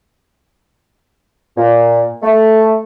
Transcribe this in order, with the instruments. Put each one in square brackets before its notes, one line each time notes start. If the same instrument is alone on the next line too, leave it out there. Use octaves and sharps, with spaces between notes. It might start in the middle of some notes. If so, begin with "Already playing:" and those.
[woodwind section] A#2
A3